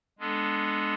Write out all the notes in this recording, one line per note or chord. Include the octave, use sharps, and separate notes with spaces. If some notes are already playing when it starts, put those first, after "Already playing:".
G#3 B3 D4 A4